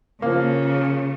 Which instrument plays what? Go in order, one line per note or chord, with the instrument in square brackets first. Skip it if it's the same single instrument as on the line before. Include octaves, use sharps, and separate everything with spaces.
[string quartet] C#3 [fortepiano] F3 A#3